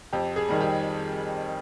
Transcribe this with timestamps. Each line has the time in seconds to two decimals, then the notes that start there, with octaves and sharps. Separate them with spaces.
0.13 F2 G4
0.36 G#4
0.49 D#3 G3
0.60 G4